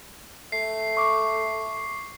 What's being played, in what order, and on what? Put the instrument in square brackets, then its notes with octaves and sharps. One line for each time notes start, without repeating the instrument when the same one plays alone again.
[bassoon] A3 [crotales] C7
[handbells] C#6 D6